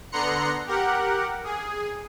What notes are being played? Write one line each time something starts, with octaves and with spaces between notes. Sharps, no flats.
D3 B3 A#5 C6 F#6 C#7
G4 A#4 F#5
G#4